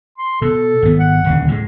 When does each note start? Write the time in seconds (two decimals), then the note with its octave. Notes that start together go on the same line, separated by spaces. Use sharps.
0.18 C6
0.42 B2 A4
0.83 G#1 B3
0.99 F#5
1.25 D#1 D2 C#3
1.48 A2 F3 G#3